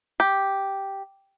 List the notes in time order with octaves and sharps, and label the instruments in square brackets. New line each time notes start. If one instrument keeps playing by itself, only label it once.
[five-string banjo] G4